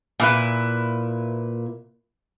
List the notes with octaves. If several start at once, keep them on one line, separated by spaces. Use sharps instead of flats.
A#2 E4 B4